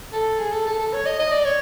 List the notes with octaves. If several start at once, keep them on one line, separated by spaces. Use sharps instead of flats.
A4
G#4
A4
A4
A4
C#5
D#5
D#5
D5
C#5